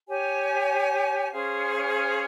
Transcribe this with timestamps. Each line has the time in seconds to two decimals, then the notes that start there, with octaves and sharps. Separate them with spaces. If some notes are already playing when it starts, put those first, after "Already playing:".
0.06 G4 C#5 G#5
1.31 C#4 G#4 C5 F5